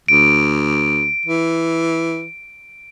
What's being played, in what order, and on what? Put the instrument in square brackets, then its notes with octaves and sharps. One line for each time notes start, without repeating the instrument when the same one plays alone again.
[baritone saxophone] D2 [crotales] D7
[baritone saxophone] E3